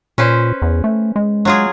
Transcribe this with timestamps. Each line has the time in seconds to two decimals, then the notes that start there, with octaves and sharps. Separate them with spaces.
0.18 A#2 C#4 B4 C5
0.62 E2
0.84 A3
1.16 G#3
1.45 F#3 F4 G#4